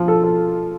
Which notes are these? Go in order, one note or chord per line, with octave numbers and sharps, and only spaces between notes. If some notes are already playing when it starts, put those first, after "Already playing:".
Already playing: F3 F4
A4
A4